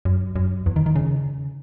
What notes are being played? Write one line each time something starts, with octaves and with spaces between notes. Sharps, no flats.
F#2
F#2
E2
D#3
D#3
C#3